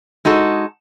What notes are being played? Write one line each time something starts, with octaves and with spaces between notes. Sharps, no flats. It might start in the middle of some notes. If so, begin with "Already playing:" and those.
G#3 D#4 F#4 A4